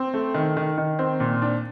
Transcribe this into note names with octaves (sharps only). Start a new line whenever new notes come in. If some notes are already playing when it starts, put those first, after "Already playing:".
Already playing: C4
A3
D#3
D#3
D#3
C4
A#2
D4